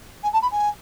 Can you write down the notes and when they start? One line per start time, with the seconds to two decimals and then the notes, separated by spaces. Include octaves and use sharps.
0.23 G#5
0.33 A5
0.42 B5
0.52 G#5